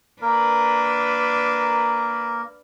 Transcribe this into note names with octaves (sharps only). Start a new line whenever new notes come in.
A#3 D4 A#4 B4